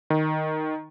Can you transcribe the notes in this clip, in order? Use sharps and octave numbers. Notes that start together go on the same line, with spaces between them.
D#3